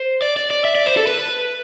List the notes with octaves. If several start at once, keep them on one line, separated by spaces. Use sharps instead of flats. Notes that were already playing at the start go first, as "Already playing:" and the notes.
Already playing: C5
D5
D5
D5
E5
D5
C5
A4
B4